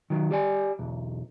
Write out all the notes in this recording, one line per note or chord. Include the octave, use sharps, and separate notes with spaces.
D#3 F#3
G4 D5 G#5
B1 E2